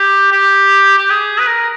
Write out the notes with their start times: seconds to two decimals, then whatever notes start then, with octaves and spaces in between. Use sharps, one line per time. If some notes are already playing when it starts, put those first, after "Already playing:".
Already playing: G4
0.32 G4
0.98 G4
1.10 G#4
1.40 B4
1.47 A#4